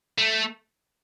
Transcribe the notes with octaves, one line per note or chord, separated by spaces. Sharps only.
A3